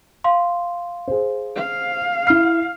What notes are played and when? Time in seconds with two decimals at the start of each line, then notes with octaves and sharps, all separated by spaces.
0.24 F5 C6
1.08 G#4 C5
1.56 F5
2.27 E4 F6 C7